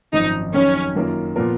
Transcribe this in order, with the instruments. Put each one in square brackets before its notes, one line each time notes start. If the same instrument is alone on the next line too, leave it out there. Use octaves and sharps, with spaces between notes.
[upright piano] G#1 F#2 F3 [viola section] D#4
[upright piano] F2 D#3 F#3 [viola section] C#4
[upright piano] F#2 D#3 A#3 F4 A#4
A#2 F3 B3 F4 A#4